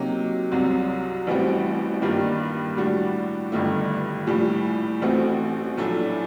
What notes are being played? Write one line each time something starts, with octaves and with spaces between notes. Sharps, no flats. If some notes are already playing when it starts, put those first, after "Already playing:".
Already playing: C3 F#3 A#3 D#4 G4
C2 C3 F#3
A1 A2 G3 C4 F#4
G2 D#3 G3 A#3 D4
A2 G3 D4 F#4
G1 G2 D#3 A3
A#1 A2 G3
A1 A2 A3 C4 F#4
A#1 A2 F#3 A3 D4